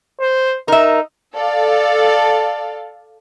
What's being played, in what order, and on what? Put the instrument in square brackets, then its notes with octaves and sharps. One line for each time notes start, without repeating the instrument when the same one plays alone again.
[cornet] C5
[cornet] D#4 [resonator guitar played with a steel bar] A#4 E5
[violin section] A4 D5 F5